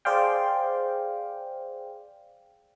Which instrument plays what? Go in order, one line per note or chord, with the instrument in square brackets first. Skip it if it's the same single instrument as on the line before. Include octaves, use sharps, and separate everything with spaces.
[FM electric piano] G#4 C5 D5 F5 G5